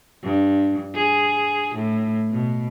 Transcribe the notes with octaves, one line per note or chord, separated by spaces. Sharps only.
G2
G#4
A2
B2